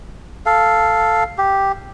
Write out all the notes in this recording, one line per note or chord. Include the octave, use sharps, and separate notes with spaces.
A4 F5
G4